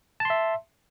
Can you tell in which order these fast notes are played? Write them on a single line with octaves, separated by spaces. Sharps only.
A5 C6 E5